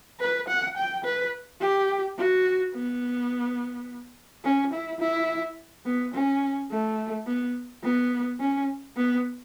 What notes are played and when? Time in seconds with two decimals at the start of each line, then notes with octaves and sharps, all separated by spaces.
0.20 B4
0.48 F#5
0.77 G5
1.04 B4
1.61 G4
2.18 F#4
2.74 B3
4.44 C#4
4.73 E4
5.00 E4
5.85 B3
6.14 C#4
6.71 A3
7.27 B3
7.84 B3
8.40 C#4
8.97 B3